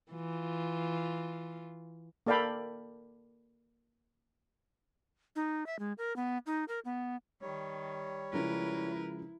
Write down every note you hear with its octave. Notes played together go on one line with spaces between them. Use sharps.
E3 F4
A#3 A4 D5 F5 G5 B5
D#4
E5
G#3
A#4
B3
D#4
A#4
B3
D#3 G3 C#5
C#3 F3 G#3 E4 A#4 B4